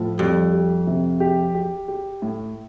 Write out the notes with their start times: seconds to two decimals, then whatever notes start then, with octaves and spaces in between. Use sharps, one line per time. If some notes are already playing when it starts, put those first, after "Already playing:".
Already playing: A2 F3
0.19 F2 G3
0.53 G4
0.87 C3
1.20 G4
1.55 G4
1.88 G4
2.22 A2